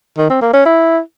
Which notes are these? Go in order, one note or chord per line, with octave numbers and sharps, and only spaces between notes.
D#3
C4
A#3
C#4
E4